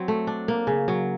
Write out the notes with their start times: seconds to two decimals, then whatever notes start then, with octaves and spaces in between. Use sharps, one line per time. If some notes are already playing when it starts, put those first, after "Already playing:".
Already playing: F#3 C4
0.08 A3
0.27 D4
0.48 A#3
0.67 C#3
0.88 F#3